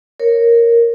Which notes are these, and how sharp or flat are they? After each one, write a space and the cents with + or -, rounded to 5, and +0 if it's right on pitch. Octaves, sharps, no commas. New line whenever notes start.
A#4 +0 C#5 +0